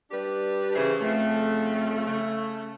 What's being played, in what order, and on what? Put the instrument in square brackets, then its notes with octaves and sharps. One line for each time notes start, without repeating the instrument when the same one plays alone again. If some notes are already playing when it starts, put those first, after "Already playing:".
[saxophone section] G3 D4 G4 B4
C#3 E3 G#4 B4 C5
F2 C#3 A3
C#3 A3